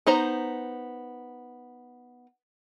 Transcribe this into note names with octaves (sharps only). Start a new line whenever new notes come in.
B3 D#4 C5 A#5